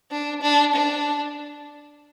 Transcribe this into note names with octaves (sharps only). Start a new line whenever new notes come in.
D4
D4
D4